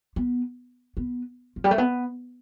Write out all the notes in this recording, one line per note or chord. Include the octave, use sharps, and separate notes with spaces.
B3
B3
F3
G3
A3
B3